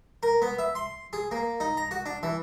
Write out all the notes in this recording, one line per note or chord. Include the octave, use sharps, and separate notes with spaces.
A#4
B3
E5
C6
G#4
A#3
D#4
A#5
F#4
D4
E3